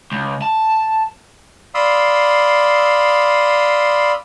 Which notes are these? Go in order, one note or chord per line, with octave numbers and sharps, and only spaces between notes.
C#2
A5
D5 F5 B5 C6 D#6 E6